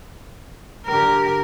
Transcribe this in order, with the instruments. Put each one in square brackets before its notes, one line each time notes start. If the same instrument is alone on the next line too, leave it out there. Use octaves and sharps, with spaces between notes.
[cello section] D3 G4 [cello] A#4